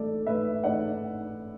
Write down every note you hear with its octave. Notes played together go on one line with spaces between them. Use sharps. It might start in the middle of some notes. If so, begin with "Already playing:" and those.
Already playing: A2 A3 A4 D5
A2 B4 E5
A3 D5 F#5